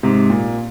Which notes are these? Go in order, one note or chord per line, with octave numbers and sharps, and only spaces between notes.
G#2 C3
A#2